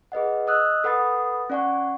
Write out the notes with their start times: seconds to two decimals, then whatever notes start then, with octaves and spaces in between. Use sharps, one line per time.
0.12 G#4 B4 D#5 F#5
0.47 D#5 D#6 E6 F#6
0.84 A4 B4 F#5 B5 D#6 A6
1.50 C#4 D5 F#5 G#5 C#6